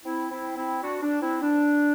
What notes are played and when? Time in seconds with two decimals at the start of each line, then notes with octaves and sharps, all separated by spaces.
0.06 C4 E4
0.31 C4 E4
0.57 C4 E4
0.83 D4 F#4
1.02 D4
1.22 C4 E4
1.42 D4